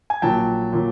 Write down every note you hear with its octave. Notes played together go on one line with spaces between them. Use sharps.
G#5
A#1 A#2 F#3 G5 A5
A#2 F#3